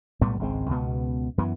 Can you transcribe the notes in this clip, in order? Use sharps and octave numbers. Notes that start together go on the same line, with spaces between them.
B1 A2 G3 B3
G#1 C#2 G#3 C4
C#2 B2 B3
F#2 E3 B3